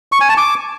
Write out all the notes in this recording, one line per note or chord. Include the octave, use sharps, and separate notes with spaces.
C#6
G#5
A5
D6